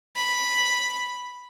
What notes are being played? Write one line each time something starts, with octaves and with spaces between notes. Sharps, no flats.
B5